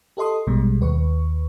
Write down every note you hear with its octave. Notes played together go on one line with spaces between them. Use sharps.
G4 A4 D#5 C6 D#6
A#1 B2 G3 G#3
D#2 B4 C#6